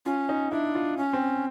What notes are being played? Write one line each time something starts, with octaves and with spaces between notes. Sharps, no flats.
C#4 F4
D#4
D4 E4
F4
C#4
C4